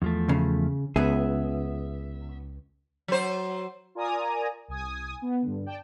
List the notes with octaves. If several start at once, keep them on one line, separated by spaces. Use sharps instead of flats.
E2 F3 A3
C#3
C#2 B3 G#4 E5
F#3 C5
F4 A#4 D5 G#5 A#5 D#6
C2 G#5 D#6
B3
G2 D3
D5 G5 A5